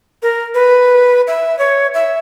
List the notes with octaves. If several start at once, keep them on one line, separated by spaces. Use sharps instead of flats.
A#4
B4
E5
C#5
E5